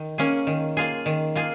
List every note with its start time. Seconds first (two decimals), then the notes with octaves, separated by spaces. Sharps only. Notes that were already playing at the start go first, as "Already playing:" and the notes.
Already playing: D#3
0.18 A#3 C#4 G#4
0.47 D#3
0.77 A#3 F4 G#4
1.06 D#3
1.35 A#3 F4 G#4